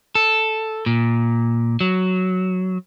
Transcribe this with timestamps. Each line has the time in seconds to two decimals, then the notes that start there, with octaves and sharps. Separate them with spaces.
0.15 A4
0.86 A#2
1.81 F#3